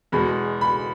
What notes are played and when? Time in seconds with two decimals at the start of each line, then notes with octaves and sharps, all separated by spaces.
0.12 E2 B2 G#3 B5
0.61 B5